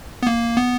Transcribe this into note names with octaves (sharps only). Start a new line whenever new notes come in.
B3
A#3
B3